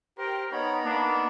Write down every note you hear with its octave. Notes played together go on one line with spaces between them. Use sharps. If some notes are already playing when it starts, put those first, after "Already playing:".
G4 A#4 C5 G5
B3 D#4 C#5 A#5 B5
A#3 D4